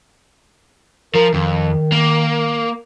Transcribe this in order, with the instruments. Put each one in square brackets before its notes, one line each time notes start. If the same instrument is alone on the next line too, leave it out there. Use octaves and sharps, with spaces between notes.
[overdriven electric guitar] F3 [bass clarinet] A#4
[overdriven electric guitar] F2 [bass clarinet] D#3
[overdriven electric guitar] A#3